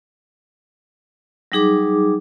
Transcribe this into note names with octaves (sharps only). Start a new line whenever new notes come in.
F#3 G3 D#4 G#4 D6